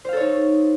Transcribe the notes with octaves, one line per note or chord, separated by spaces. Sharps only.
D#4 A4 C5 C#5 F5